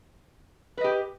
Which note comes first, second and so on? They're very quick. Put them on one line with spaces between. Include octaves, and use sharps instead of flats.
B4 D#5 G4